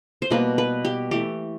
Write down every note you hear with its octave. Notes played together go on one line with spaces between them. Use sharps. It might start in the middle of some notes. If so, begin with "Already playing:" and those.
C5
B2 G3 A#3 B4
B4
G4
E3 A3 G4